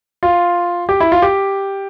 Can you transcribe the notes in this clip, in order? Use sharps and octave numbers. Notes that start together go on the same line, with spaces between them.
F4
G4
E4
F4
G4